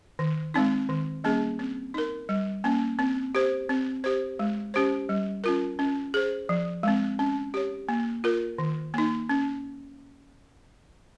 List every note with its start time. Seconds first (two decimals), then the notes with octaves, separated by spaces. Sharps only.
0.19 D#3
0.54 G#3 C4 D#4
0.89 D#3
1.24 G3 A#3 C#4 G#4
1.59 C4
1.94 D#4 A#4
2.29 G3
2.64 A#3 C#4
2.99 C4
3.35 G4 C5
3.69 C4
4.04 G4 C5
4.39 G#3
4.74 C#4 G4 C5
5.09 G3
5.44 C#4 F4 A#4
5.79 C#4
6.14 G#4 C5
6.49 F3
6.83 G#3 C4
7.19 C#4
7.54 G4 C#5
7.89 A#3
8.24 F4 A#4
8.59 D#3
8.94 A#3 D#4
9.29 C#4